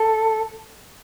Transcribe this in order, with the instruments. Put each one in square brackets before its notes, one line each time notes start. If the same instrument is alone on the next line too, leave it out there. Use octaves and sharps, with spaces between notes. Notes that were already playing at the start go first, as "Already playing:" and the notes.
Already playing: [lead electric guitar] A4